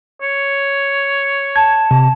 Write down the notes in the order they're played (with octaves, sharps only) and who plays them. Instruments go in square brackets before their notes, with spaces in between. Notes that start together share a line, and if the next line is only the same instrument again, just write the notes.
[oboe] C#5
[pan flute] A5 [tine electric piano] G#6
[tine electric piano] C3